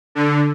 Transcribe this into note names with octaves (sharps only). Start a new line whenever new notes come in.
D3